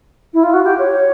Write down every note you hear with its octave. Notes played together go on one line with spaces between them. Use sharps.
E4
F4
F#4
G4
C#5